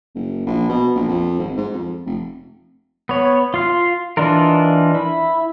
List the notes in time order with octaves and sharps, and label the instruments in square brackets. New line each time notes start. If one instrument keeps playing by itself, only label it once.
[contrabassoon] F#1
A#1
B2
A#1
F2
G#1
G#2
F2
F1
[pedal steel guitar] B3 C#5
F4 F5
E3 D4 D#4 F4 A#4
E4